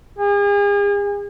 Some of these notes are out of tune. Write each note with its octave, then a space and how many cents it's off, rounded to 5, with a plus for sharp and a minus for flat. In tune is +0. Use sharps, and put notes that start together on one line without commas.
G#4 -40